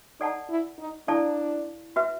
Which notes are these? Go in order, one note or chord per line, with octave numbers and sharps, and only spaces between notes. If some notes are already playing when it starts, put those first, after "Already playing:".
D#4 A4 D5 F#5 A5
E4
D#4
D4 E4 A4 D5 F5 A5
F#4 B4 E5